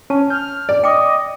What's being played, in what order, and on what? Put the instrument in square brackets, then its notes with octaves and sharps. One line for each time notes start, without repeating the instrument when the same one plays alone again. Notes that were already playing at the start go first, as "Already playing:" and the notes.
[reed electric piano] C#4 [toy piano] A5
[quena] F6 [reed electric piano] G6
[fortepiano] D5
[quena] D#5 [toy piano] G5 D6